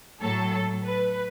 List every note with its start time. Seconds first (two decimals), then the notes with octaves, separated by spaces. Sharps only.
0.22 A2 F#3 A4
0.84 B4